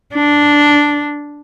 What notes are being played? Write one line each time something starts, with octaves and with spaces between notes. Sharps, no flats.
D4